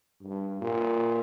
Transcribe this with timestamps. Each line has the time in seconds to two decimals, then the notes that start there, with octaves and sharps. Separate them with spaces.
0.23 G2
0.61 A#2